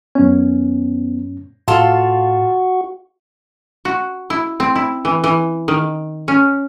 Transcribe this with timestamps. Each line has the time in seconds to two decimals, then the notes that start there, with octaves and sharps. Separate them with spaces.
0.15 F#2 B3 C#4
1.68 A2 F4 F#4 A4 F5 C6
3.85 F#4
4.30 E4
4.60 C4
4.76 E4
5.05 E3
5.24 E3
5.68 D#3
6.28 C#4